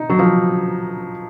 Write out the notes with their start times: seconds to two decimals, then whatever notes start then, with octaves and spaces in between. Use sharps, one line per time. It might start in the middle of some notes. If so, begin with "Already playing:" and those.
Already playing: D#4
0.10 F#3
0.19 F3